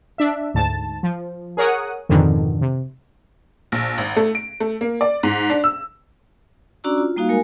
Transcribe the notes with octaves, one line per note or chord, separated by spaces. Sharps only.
D4 E5
D2 G#2 A5
F3
G#4 A#4 C#5 F#5 D#6
F2 G#2 B2 D3 D#3
C3
A#1
G#1
A3
D7
A3
A#3
D5
G#2
D4
E6
C#4 D4 F#4 D5 A#5 E6
F4
G3 A#3 D#4 F#4 F5
G#3 A#4 G#5